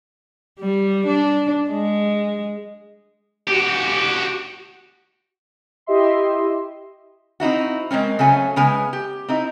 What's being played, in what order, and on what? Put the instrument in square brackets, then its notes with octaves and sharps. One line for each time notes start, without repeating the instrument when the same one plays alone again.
[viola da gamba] G3
D4
G#3
[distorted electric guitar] F#4 G4
[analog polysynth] E4 G4 D#5 E5 C6
[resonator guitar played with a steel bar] C4 D#4 E4 F#4
G#3 A#3 C4 C#4
C#3 F#3 A3 C#4 G#5
C#3 G#3 B3 G#5
G4
C4 D#4 E4